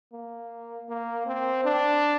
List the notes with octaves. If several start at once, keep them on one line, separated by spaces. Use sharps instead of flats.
A#3
A#3
C4
D4